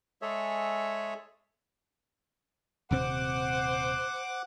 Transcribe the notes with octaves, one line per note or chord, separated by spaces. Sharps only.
G#3 G#4 A4 C#5 E5
D#1 C3 C4 C5 F#5 D6